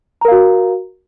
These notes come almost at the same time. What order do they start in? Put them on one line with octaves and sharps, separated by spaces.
A#5 A#4 F5 F#4